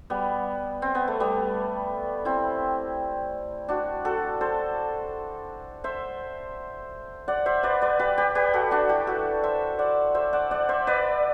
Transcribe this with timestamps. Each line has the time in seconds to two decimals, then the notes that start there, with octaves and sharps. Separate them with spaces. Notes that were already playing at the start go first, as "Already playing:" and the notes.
0.10 G3 B3
0.82 C4
0.95 B3
1.08 A3
1.20 G3 B3
2.25 C4 E4
3.68 D4 F#4
4.05 F#4 A4
4.41 A4 C5
5.84 C5 E5
7.28 D5 F#5
7.46 C5 E5
7.63 B4 D5
7.82 B4 D5
7.99 G4 B4
8.18 G4 B4
8.35 G4 B4
8.53 F#4 A4
8.71 D4 F#4
8.89 E4 G4
9.07 F#4 A4
9.44 C5 E5
9.79 D5 F#5
10.14 C5 E5
10.33 D5 F#5
10.51 D5 F#5
10.69 C5 E5
10.87 B4 D5